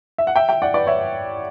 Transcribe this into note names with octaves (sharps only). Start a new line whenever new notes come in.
E5
F#5
E5 G5
E5 G5
D5 F#5
B4 D5
C#5 E5